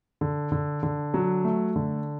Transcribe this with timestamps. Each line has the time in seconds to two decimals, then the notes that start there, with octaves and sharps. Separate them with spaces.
0.21 D3
0.52 D3
0.83 D3
1.14 F#3
1.44 A3
1.76 D3